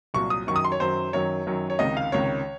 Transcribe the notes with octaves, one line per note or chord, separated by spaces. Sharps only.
C2 A#2 F#3 C#6
D#6
F#2 D#3 F#3 C#6
D#6
C6
C#5
F#2 D#3 F#3 C5
F#2 D#3 F#3 C#5
F#2 D#3 F#3
C#5
C#2 C3 D#3 D#5
F5
C#2 C3 D#3 C#5